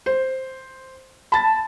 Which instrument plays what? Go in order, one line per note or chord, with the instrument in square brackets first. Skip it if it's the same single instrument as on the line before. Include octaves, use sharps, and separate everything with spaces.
[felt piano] C5
[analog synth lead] A5 [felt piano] B5 A6